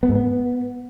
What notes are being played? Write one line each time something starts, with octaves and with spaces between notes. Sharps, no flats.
B3
G#2
B3